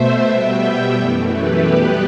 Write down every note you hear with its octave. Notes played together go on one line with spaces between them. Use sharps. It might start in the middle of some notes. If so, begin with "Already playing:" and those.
Already playing: B2 A3 C5 E5
B2 G3 B3 E5 G5
F#2 E3 A3
G4 B4
B2 G3 B3